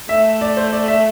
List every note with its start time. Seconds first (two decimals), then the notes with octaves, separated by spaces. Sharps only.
0.09 A3 E5
0.41 D5
0.57 C5
0.73 D5
0.88 E5